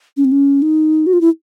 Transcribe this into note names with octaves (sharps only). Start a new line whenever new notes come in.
C#4
C4
C#4
D#4
F#4
F4
E4